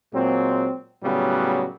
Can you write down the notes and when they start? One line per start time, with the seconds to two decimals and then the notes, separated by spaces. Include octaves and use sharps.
0.13 A#2 F#3 G#3 C4
1.03 A2 C#3 F#3 G3 B3